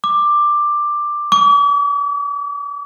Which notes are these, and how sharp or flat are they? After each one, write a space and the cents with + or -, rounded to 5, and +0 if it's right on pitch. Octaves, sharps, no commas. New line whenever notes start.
D6 +10
D6 -45